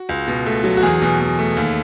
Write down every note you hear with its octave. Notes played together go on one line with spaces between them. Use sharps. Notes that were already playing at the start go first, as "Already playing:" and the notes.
Already playing: F#4
C#2
B2
A3
F#3
F#4
E2 G#4
B2
E2
A3
D#2